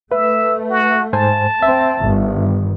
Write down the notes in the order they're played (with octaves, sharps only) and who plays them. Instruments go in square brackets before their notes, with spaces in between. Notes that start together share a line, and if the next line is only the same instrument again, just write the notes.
[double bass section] A3 [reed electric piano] B4 [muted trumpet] E5
[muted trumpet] F#4
[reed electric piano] G#2 C5 G#5 [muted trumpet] A5
[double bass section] C4 [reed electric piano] E5
[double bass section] G1 D#3